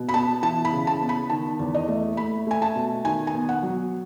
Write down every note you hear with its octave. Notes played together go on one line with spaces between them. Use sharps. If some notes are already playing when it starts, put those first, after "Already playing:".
Already playing: B2
B5
B3 A5
E3 A5
B5
C#3
A5
B3
B5
D#3 A5
E2
D#5
A3
A3 B5
A3 G#5
A5
B2
D#3 G#5
G#5
B3
F#5
F#3